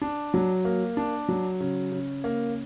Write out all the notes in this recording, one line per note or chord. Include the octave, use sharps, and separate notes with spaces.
D4
F#3
A#3
D4
F#3
C#3
C#3
A#3